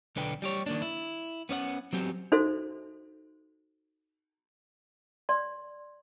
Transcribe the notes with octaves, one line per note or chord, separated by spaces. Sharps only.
B1 D3 B4 G5
G3 G4 C#5
D#3 A#3 D4
E4
B3 C#4 D5 F#5
F#3 B3 C4 G4
D#4 F#4 A4 C5 E5
D5 C6